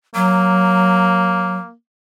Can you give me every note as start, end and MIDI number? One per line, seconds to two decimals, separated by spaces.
0.15 1.57 54
0.15 1.73 58